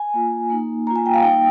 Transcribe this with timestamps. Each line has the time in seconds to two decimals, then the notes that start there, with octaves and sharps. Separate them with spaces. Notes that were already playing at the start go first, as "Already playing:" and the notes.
Already playing: G#5
0.14 A#3 F4
0.50 A#3 D#4
0.87 A#3 F4 A#5
0.96 G#5
1.06 G5
1.14 F5
1.23 G3 A#3 D#4 G5